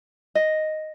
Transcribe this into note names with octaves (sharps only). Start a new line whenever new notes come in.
D#5